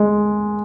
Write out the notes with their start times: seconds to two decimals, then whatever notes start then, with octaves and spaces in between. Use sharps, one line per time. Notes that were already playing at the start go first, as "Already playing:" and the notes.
Already playing: G#3